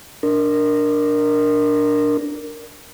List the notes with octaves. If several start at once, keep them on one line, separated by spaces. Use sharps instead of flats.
D4 A#4